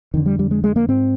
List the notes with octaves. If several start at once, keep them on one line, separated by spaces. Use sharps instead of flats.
F2 D3 D#3
G3
G3
G#3
G#3
A#3
G#2 C4